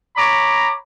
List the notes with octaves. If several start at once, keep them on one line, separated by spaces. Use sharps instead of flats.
C#5 A#5 B5 D6